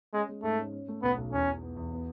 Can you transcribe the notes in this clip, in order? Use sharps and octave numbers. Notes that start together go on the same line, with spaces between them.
G#3 C#4
G#3
G#2 A3
C#4
C#4
A3
B1 B3
B1
E2 C#4
E2
B3
E2
B3